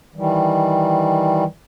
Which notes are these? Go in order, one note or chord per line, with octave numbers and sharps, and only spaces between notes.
D#3 E3 G3